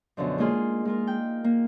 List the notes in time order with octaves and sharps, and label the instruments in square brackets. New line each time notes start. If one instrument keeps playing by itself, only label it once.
[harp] F#2 B2 D3 F3
G#3 A#3 D#4 F4 G#4
G#3 F4 A#4
G5
A#3